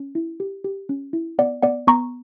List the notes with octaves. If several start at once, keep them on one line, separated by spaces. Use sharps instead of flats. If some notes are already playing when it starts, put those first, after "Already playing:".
Already playing: C#4
E4
G4
G4
C#4
E4
B3 D5 F#5
B3 D5 F#5
B3 A#5 C#6